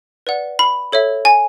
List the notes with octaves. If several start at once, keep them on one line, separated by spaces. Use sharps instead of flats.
B4 D5 F#5
B5
A4 C#5 E5
G#5